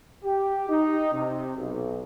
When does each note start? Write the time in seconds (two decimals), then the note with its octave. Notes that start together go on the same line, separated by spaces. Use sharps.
0.24 G4
0.69 D#4
1.13 C3
1.56 B1